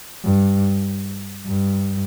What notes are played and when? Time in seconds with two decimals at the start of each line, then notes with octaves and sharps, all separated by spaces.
0.24 G2
1.46 G2